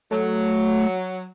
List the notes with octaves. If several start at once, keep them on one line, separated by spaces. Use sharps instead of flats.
F#3 A3